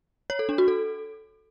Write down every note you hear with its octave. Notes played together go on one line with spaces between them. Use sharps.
C#5
A4
D4
F#4
A4